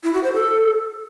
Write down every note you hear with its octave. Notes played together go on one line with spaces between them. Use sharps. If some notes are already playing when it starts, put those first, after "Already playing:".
E4
F#4
C5
A4